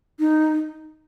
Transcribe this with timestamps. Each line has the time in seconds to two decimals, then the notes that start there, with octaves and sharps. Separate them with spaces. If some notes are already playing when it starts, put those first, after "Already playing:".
0.19 D#4